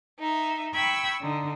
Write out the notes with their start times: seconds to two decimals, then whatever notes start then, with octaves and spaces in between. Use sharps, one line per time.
0.19 D#4 E5
0.74 G5 B5 C#6 E6 G#6
1.22 D3 D#4